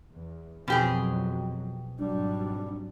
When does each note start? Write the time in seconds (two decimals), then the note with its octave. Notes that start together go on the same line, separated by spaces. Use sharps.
0.14 E2
0.68 F2 B2 F#3 G4 G#4
1.99 G#1 F#3 G3 D4